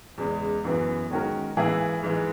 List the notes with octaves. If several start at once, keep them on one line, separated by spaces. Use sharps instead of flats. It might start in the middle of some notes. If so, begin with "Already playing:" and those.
E2 C#3 G#3
F#2 E3 B3 F#4
D#3 G#3 C#4 F#4 A#4
G#2 E3 A#3 E4 G#4
G#2 E3 G#3